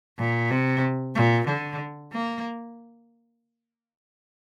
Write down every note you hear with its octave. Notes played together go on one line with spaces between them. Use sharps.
A#2
C3
A#2
D3
A#3